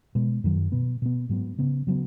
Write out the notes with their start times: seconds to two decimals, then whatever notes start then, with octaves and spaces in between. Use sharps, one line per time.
0.15 B2 G#3 B3
0.44 F#2 D#3 F#3
0.72 B2 B3
1.02 B2 B3
1.29 G#2 F#3 B3
1.58 C#3 B3
1.87 C#3 F#3 B3